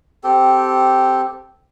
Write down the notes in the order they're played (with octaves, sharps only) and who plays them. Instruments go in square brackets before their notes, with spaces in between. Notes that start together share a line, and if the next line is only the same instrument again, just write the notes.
[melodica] C4 G4 A4